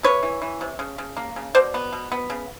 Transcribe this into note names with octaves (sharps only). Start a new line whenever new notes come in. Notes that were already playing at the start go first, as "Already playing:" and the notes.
C3 B4 C#5
E3
E3
C3
C#3
C#3
A#3
C#3
B2 C5 D5
B3
B2
B3
C#3